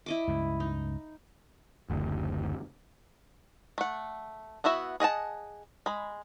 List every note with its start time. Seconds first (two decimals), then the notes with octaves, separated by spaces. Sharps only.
0.06 E4 D#5 D6
0.27 C#2 G2
0.60 D#4
1.90 F#1 D2
3.78 A3 F#5
4.64 B3 E4 F#4 E5
5.00 G#4 D#5 F#5 A5
5.86 G#3 B5